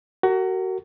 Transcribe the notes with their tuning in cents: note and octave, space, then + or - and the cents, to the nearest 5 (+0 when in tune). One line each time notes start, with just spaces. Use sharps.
F#4 +25 A#4 -30